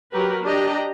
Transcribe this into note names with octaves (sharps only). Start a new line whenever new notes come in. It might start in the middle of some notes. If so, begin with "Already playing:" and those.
F#3 G4 A#4 B4
D4 G4 D#5 A#5